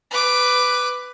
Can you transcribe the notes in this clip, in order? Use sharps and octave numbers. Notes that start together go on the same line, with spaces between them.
B4 D6